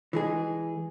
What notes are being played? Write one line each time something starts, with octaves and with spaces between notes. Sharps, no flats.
E3 G#3 G#4